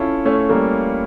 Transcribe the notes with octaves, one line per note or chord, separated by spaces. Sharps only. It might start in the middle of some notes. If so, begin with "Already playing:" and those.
Already playing: C#4 E4 F4 A4
A3 C#4
G3 A#3